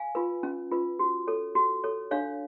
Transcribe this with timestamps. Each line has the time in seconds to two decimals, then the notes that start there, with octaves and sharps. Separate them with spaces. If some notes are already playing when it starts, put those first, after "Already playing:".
Already playing: F5 G#5
0.15 F4 B4
0.43 C#4
0.71 F4 B4
0.99 F#4
1.27 A4 C#5
1.55 F#4
1.84 A4 C#5
2.11 D4 C#5 F5